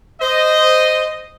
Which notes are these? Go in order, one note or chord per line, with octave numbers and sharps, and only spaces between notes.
C5 D#5